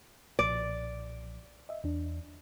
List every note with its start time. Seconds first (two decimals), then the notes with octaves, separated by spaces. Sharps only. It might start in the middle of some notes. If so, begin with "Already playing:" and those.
0.39 B1 A#2 F3 D5
1.69 D#5 E5
1.84 E2 D4